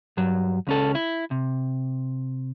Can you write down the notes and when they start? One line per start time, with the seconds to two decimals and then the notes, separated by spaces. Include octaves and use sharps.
0.17 G2 F#3
0.67 C#2 C#4 A4
0.95 E4
1.31 C3